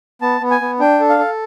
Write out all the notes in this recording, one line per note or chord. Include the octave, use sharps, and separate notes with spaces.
B3 A5
B3
G#5
B3
D4 G5
A4
F5
A4